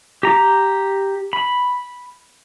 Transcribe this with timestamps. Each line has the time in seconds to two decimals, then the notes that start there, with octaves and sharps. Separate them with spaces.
0.23 G4 A#5
1.33 B5